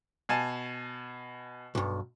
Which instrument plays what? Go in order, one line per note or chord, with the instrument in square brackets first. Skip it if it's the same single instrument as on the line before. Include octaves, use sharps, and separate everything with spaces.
[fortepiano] B2 G#5 A5
[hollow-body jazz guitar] B1 G2